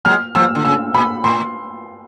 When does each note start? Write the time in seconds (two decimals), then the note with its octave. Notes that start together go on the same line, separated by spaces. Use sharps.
0.05 F#3 G#3 F6
0.35 F3 G3 E6
0.55 D3
0.65 C#3 E6
0.94 A#2 B5
1.24 A2 C6